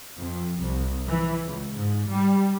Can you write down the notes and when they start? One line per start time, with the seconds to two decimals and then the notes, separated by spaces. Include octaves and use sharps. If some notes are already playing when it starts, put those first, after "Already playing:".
0.17 F2
0.60 C2
1.07 E3
1.45 C#2
1.76 G#2
2.10 G3